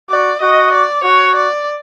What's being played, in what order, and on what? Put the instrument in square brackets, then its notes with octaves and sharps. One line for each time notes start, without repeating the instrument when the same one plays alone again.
[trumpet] F#4 [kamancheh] D5
[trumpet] F#4 [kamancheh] D#5
[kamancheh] D5
[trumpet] F#4 [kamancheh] C#5
[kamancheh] D5